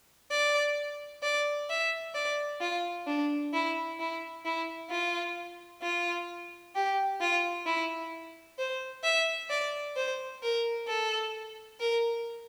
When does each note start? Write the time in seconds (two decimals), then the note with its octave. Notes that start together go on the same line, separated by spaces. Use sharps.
0.31 D5
1.23 D5
1.70 E5
2.14 D5
2.61 F4
3.07 D4
3.53 E4
3.99 E4
4.45 E4
4.90 F4
5.82 F4
6.75 G4
7.21 F4
7.66 E4
8.58 C5
9.04 E5
9.50 D5
9.96 C5
10.43 A#4
10.88 A4
11.80 A#4